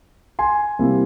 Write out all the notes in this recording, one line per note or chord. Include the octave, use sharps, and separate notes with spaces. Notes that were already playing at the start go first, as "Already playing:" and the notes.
G#5 C6
C3 G3 A#3 E4